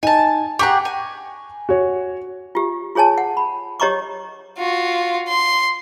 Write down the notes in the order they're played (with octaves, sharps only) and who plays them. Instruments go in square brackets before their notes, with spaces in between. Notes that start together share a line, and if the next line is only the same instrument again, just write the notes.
[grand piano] D#4 [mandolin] G#5 A5
[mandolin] G4 G#4 F#5 [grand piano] A#5 C#6
[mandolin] G#5
[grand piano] F#4 C#5
[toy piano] F4 G4
F4 G#4 C#5 G#5 A5
F#5
B5
G4 C#5 D#5 A#5 C#6 D6
[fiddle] F4 F#4
C6